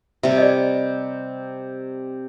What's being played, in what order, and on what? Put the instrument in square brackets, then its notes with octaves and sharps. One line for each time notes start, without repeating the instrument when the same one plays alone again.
[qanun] C3 G3 [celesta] E5
[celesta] D5 D#5